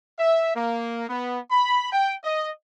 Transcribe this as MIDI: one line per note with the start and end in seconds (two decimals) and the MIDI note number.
0.19 0.53 76
0.55 1.04 58
1.09 1.39 59
1.51 1.88 83
1.92 2.14 79
2.24 2.49 75